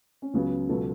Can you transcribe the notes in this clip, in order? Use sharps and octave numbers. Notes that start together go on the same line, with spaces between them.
C#4
C#2 C#3 F#3 B3
C#2 B2 F#3 A4